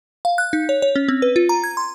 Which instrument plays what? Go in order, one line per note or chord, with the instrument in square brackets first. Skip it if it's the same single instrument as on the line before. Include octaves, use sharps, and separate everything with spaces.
[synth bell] F5
F#6
D#4
C#5
C#5
C#4
C4
B4
F4
A#5
G#6
C6